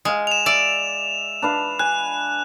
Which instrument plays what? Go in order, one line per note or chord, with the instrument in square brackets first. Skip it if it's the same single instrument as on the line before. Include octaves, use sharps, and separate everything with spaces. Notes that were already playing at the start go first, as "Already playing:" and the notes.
[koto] G#3 [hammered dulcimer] D#5 F5
[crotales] E7 F7
[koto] D5 [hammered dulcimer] E5
[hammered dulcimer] D4 B4 F5
[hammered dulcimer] G#5 [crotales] F#6